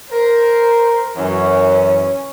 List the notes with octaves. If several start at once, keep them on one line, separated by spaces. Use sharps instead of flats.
A#4 C5
F#2 E3 C#4